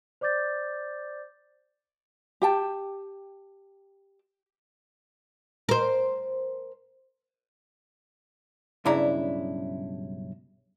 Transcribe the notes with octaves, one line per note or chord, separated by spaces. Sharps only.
C5 D5 D6 G6 A6
G4 G5 A5
A#4 C5
B1 G2 C#3 D4 E4 A#5